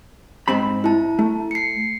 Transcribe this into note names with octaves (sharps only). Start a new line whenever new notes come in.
G#2 C4 B5
E4 A5
A3
C7 C#7